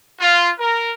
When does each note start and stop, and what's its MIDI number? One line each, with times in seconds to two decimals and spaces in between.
0.19 0.50 65
0.59 0.93 70